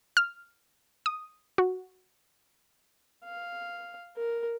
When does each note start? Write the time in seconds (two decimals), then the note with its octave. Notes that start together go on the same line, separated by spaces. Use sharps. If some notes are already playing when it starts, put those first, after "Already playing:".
0.17 F6
1.06 D#6
1.58 F#4
3.25 F5
4.17 A#4